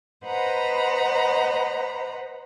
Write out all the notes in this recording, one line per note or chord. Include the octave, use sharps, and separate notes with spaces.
B4 C5 D#5 F#5 A#5 B5